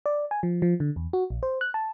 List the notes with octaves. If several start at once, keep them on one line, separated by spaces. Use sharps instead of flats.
D5
G#5
F3
F3
D3
E2
F#4
A#1
C5
F#6
A5